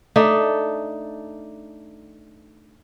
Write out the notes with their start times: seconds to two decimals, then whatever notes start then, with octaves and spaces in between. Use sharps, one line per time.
0.16 A3 D4 D#4